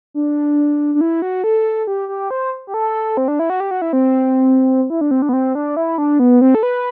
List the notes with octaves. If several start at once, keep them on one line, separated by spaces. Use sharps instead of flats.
D4
D4
E4
F#4
A4
G4
G4
C5
G4
A4
C4
D4
E4
F#4
G4
F#4
E4
C4
E4
D4
C4
D4
B3
C4
D4
E4
D4
B3
C4
A4
B4